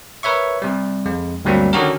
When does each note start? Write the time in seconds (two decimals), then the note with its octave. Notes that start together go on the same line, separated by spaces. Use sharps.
0.23 A#4 B4 C#5 E5 C#6
0.62 C3 G3
1.06 F2 G#3
1.45 D2 G2 F#3 G3 A#3 C4
1.73 D3 D#3 C#4 F#4 G4 A#4